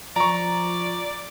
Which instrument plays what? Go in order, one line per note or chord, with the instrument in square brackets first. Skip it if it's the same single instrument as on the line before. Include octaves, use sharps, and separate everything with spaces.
[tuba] F3 [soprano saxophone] D5 [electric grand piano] A#5 C#6